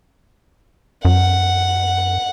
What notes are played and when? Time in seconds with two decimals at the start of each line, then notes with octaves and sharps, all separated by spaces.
1.05 F#2 F#5